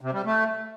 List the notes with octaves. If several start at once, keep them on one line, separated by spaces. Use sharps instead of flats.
C3
G3
A3